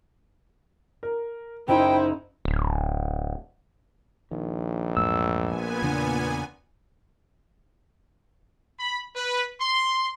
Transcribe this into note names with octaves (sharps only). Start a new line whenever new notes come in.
A#4
F#1 D#4 E4 C5 G5
D1
A#1 D#3
E2 G#2 A3 E6
A#2 B3 G#5
E2 C#3 D4
B5
B4
C6